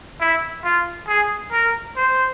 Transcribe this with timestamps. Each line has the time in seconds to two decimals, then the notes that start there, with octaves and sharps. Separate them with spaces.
0.20 E4
0.64 F4
1.08 G#4
1.52 A#4
1.96 C5